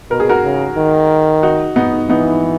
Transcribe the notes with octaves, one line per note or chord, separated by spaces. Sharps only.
B2 A#4
G#4
F#4 A#4
C#3
D#3
D#4 F#4
B3 D#4
E3 B3 D#4